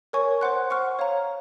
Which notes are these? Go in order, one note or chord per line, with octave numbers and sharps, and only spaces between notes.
A#4 C#5 G#5 C#6
C5 F#5 C6 F#6
F#5 C#6 F6
C#5 F5 A#5